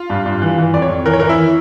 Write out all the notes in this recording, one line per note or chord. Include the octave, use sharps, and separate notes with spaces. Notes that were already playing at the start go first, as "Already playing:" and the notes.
Already playing: F4
G2
G2
E3
E3
F2 D5
C#5
F2
E3 A#4
C#5
E3 A#4
E4